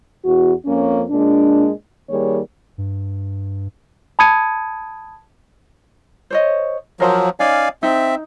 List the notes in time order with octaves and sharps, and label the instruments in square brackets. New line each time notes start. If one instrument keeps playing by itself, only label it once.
[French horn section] E2 F#4
F2 A#3 C#4
A#2 G#3 D4
D#3 G3 A#3 G#4 C#5
[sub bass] G2
[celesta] A5 B5 D#6 G#6 C#7 D#7
[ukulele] C5 C#5 D#5
[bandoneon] F3 F#3 [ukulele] A#4 C5 F5
[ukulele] C#4 D#4 [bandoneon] D5 F5 G#5
[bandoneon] C4 E5 [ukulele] D#4